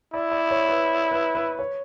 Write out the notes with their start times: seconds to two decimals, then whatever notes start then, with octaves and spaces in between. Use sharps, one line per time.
0.13 E4 D5
0.32 D5
0.51 C#5
0.68 B4
1.11 B4
1.35 B4
1.59 C#5